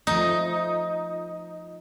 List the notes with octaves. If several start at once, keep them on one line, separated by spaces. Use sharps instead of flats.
F3 A3 D#4